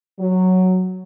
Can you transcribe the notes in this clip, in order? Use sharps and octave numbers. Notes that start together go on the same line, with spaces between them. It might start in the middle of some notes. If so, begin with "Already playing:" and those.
F#3